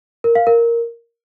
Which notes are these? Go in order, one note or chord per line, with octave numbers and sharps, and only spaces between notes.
A#4
F5
A#4